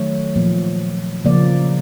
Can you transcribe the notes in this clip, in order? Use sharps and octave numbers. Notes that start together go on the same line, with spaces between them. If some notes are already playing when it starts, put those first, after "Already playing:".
Already playing: D#3 F#3 A3 C#5
A#2 F3 A#3
C#3 F3 A#3 D5